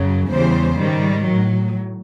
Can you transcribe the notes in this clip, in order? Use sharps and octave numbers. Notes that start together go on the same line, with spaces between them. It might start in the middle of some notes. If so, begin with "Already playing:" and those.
Already playing: F#2 C#3 F#3
E2 C#3 E3 G3 C5
G#2 D#3 G3
A2 F#3